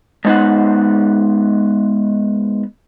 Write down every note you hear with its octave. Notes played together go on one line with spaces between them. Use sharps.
G#3 B3 D#4 C5 F#5